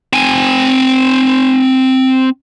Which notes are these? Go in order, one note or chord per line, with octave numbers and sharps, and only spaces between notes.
C4 G#5